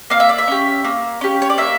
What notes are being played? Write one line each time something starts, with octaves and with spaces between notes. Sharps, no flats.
A#3 F5
E5
D5
E5
C#4 G4
A#3
C#4 G4
C#5
D5
A#3 E5